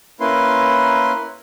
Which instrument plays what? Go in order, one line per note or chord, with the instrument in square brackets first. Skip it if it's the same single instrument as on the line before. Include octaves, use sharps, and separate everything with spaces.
[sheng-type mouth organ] A#3 C#4 E4 B4 C6